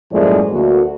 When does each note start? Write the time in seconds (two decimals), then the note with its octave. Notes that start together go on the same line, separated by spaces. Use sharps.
0.12 F#2 A2 F3 G#3 A#3 D5
0.51 D2 A#3 F#4